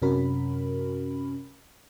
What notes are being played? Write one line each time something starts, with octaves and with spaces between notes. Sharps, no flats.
F#2 C3 C#4 F#4 A#4 B5